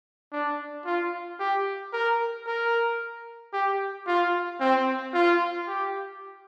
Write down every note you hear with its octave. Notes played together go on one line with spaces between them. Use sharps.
D4
F4
G4
A#4
A#4
G4
F4
C4
F4
G4